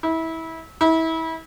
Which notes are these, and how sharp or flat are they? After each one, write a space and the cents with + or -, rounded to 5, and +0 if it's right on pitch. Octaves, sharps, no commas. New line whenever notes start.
E4 -25
E4 -30